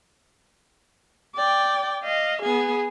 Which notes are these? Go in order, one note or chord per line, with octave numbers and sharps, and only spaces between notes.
D5 G5
D#5 F5
B3 G#4